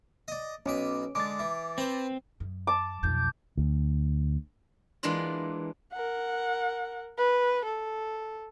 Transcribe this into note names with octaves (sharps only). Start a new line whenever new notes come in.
D5 D#5
B1 B2 C#4 B4 D6
D3 G#3 D6 A6
E3
C4 B4 C5
F#2
A5 D6
B1 F2 G6
D2
E3 G#3 A#3 D4 F4
A#4 F#5
B4
A4